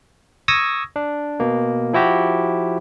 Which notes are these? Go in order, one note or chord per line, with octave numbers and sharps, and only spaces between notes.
C#6 D#6 E6 G#6 A#6
D4
B2 A#3
F3 E4 F#4 G4